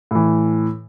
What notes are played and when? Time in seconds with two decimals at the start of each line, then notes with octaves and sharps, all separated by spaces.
0.11 A2 E3